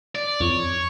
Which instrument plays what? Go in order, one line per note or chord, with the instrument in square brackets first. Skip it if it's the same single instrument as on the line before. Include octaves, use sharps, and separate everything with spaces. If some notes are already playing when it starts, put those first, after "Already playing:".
[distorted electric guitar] D5
[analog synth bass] F2 [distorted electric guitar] C#5